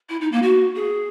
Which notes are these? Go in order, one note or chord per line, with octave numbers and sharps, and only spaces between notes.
E4
D#4
A#3
F#4
G#4